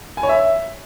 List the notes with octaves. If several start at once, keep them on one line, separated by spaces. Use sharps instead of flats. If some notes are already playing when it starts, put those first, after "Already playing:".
G#5
C#5
E5